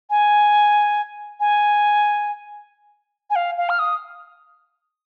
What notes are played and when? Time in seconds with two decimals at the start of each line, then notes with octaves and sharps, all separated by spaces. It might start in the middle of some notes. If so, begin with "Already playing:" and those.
0.10 G#5
1.40 G#5
3.30 G#5
3.36 F5
3.58 F5
3.70 F6
3.79 D#6